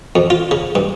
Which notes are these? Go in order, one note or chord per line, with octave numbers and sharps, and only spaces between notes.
F2
F4
C#3
G2